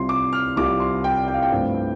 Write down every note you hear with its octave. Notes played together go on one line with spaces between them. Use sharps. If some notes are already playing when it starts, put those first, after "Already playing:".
Already playing: C2 C3 G3 F4 C6
D6
F6
C2 C3 G3 F4 D6
C6
G5
G5
F5
G5
G2 F3 A3 C4